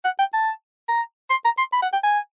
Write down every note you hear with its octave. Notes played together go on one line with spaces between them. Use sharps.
F#5
G5
A5
A#5
C6
A#5
C6
B5
F#5
G5
G#5